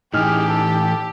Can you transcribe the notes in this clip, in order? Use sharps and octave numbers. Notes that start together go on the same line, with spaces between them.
A2 E3 D#4 G4 G#4 F6
A4